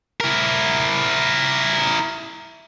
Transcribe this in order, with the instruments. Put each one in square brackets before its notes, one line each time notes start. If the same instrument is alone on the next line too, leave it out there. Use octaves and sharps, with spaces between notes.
[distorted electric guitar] E4 A#4